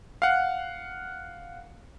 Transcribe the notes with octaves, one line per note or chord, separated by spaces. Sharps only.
F5 F#5